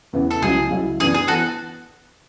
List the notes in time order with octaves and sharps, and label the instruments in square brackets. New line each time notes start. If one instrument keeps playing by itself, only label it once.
[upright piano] E2 C#3 E3 B3 E4
[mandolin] A4
[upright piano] C#2 C#3 F#3 C#4 E4 [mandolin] G#4
[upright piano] C#2 C#3 F#3 C#4 E4
[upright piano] F#2 E3 B3 D4 [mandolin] G#4
[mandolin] G#4
[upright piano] E3 B3 [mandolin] F#4 A4